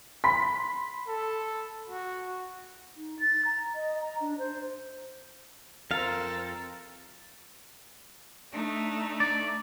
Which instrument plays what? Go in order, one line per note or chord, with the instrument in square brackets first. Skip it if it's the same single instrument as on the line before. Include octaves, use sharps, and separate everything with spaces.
[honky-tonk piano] B5 C6 B6
[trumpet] A4
F#4
[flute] D#4
A6
A#5
D#5
A#5
D4
C5
[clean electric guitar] F2 F5 [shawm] A4 [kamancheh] A#4 C5
[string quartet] A3 D4 D#4
[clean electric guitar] D5